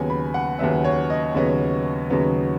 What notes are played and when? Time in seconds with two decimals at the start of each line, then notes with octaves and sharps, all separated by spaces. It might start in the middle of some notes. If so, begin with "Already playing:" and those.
Already playing: D#2 C#3 F#3 B3 G#5
0.10 B5
0.34 F#5
0.59 D#2 C#3 F#3 B3 E5
0.84 C#5
1.10 D#5
1.34 D#2 C#3 F#3 B3
2.10 D#2 C#3 F#3 B3